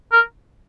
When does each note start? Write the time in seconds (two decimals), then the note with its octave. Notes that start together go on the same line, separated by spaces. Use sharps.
0.12 A#4